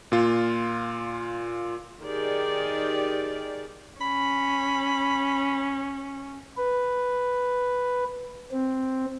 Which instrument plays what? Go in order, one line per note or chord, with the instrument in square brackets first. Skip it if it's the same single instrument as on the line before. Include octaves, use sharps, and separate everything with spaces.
[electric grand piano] A#2 F4
[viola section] D#3 G4 G#4 D5
[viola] C#4 [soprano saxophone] B5
[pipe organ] B4
C4